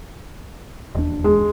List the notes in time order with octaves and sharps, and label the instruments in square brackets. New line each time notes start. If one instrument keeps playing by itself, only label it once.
[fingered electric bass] E1 D#2 D4
[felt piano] G#3